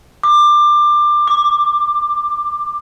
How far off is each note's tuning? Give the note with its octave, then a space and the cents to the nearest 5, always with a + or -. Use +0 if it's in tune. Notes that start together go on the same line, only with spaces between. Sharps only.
D6 +20
D6 +0